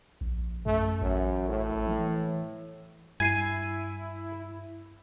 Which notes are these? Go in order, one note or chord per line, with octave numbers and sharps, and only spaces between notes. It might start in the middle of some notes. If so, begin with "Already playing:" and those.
A#1
F#2 A3
A1 F#2
A2
E3
G2 E4 G#5 G#6 C7 D#7